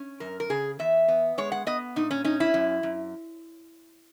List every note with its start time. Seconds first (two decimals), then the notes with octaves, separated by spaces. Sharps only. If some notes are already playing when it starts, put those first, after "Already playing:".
Already playing: C#4
0.20 F#2 A#4
0.40 A#4
0.50 C#3 G#4
0.79 E2 E5
1.08 B3
1.38 G#3 C#5
1.52 F#5
1.67 B3 D#5
1.96 A#2 D#4
2.11 C#4
2.24 C#4 D#4
2.40 E4
2.54 F#2
2.83 F#2